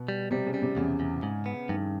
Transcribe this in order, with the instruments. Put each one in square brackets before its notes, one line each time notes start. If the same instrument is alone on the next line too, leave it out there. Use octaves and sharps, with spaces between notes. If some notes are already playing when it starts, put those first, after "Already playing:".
Already playing: [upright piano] B2
[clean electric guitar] G3
[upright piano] C3 [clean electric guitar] G3
[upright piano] C#3
[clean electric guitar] G3
[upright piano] C3
[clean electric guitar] E2 [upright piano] C#3
[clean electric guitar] E2
G#2
B3
[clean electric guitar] G2 [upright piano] D#3